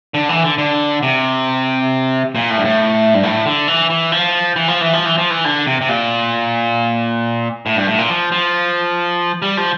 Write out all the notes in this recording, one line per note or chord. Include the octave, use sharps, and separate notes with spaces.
D3
E3
D3
D3
C3
A#2
A2
G2
A2
G2
A2
D3
E3
E3
F3
E3
F3
E3
F3
E3
F3
E3
D3
C3
C3
A#2
A2
G2
A2
A#2
F3
F3
G3
F3